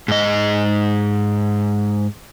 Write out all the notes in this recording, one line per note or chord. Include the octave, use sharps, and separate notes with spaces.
G#2 D#5